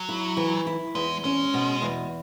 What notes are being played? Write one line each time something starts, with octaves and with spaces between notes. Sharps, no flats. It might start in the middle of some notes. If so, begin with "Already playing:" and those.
Already playing: F#3
E4
E3
E4
E2 G#3
G#3 C#4
B2
E2